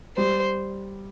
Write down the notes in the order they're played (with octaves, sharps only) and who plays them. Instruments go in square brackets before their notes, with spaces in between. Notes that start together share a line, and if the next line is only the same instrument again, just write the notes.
[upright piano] G3 [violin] C5